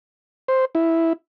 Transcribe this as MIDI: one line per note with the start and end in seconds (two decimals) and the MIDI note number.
0.48 0.65 72
0.75 1.13 64